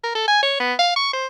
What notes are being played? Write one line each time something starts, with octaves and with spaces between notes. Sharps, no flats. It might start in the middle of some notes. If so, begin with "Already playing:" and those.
A#4
A4
G#5
C#5
B3
F5
C#6
C5